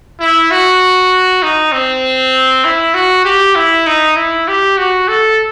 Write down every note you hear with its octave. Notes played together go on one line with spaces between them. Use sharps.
E4
F#4
D#4
C4
E4
F#4
G4
E4
D#4
E4
G4
F#4
A4